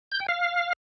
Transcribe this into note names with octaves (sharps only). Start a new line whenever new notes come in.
G6
G5
F5